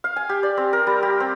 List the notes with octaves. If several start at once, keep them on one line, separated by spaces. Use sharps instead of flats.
F5
G#5
G4
D5
C4
A#4
G3
G4
C4